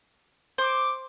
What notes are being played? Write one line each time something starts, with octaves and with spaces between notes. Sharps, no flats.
C5 D6